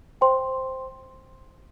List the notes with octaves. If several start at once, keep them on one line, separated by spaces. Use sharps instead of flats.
C5 G5 C6